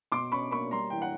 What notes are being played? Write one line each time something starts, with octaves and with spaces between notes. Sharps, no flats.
B2 C6 D6
C#4 B5 C#6
A#3 B5 C#6
G3 A#5 C6
E3 G5
F#5